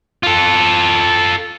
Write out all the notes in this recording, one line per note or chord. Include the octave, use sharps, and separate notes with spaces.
F4 A4